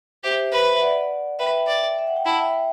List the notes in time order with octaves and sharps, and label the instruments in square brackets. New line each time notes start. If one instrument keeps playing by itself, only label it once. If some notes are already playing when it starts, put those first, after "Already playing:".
[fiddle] G4 [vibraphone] C5 E5
[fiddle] B4
[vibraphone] E5
D5 F#5
[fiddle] B4 [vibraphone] E5 G5
[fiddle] D5
[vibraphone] E5
F#5
G5
[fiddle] E4 [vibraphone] F#5 A5
[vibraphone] E5 G5